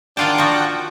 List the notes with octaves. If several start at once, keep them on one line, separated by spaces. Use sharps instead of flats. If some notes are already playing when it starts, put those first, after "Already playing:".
D#3 D4 F4 F#5 G5 A5
F3 F#4